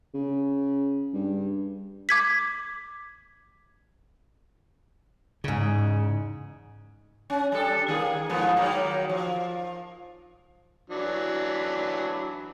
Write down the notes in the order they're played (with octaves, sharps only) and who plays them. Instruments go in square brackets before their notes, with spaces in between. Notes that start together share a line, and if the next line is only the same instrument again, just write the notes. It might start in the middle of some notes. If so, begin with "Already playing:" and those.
[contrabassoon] C#3
G2
[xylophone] D6 G#6 B6
[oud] E2 G#2 [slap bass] C#3
[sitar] C#4
G3 D4 A4
D#3 A#3 G#4
G#2 F3 B3
D#3 F#3 A#3
F3
[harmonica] E3 F#3 D4